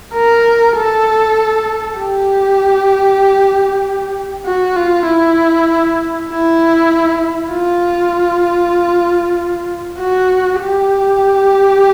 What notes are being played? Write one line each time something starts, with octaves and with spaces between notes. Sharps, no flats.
A#4
A4
G4
F#4
F4
E4
E4
F4
F#4
G4